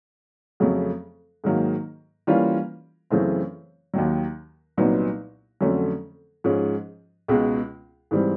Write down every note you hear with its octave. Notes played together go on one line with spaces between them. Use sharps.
F2 C#3 F#3 A3
G#2 D#3 F#3 A#3
E3 G3 A#3 C#4 F4
F#2 C#3 E3 A3 C4
D#2 D#3 F#3
C2 A#2 F#3 B3 D#4
F2 D3 F#3 A3 C#4
G#2 F3 G#3 C#4
C#2 B2 G#3
G#2 E3 G3 C4